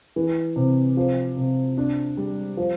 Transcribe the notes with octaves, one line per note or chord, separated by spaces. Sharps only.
E3
C3
F3
C3
D4
G3
F3